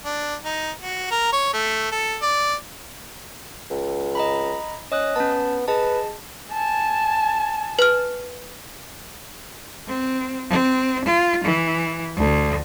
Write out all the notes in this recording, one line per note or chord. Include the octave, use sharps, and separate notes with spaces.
D4
D#4
F#4
A#4
C#5
A3
A4
D5
C#2
D#5 A#5 B5
C#4 D#5 D#6 F#6
B3 C#4 A5
G#4 B4 D#5 A5
G#5 A5
B4 F6
C4
C4
F4
E3
D2